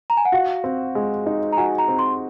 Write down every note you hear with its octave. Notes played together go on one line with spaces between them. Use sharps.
A#5
G#5
F#5
F#4 F5
C4
G#3
D#4
A#5
F#4 G#5
A#5
C4
C6